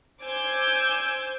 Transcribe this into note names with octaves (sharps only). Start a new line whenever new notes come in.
C5 G#5 D6 E6 G6 G#6